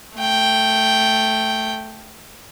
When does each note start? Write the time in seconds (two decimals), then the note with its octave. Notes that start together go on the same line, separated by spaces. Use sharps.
0.17 A3 G5